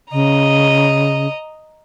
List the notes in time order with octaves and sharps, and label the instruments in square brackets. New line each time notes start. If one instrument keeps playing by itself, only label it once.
[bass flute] C#3 [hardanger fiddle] D#5 A#5